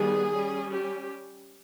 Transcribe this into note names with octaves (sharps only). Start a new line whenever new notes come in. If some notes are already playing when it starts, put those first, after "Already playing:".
Already playing: D#3 G3 B3 G#4
G3 C#4
G4